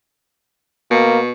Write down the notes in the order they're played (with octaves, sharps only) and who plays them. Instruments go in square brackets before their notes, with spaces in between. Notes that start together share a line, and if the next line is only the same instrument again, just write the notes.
[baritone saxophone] B2 [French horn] A#3